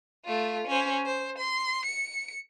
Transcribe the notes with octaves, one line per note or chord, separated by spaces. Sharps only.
A3 F4
C#4 C5
C5
C6
C#7